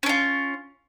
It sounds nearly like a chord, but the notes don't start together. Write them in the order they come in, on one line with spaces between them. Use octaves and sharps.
C#4 D4 F4